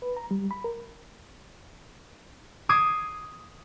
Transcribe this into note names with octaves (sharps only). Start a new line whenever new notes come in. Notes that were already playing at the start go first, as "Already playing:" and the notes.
B4
A#5
G3
B5
A#4
D6 D#6 G#6 C7 E7